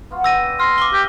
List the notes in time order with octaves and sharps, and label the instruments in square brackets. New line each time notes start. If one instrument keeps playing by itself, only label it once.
[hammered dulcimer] B3 F4 F#4
[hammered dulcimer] D4 G4 [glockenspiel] E6 A#6 D#7
[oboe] C6 [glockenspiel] F6 A#6
[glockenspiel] D6 G7
[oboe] G4